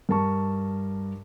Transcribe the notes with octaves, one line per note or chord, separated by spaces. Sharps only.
G2 A#4 A5 C#6